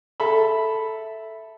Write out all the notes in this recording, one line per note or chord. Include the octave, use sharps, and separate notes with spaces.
A4 E5 B5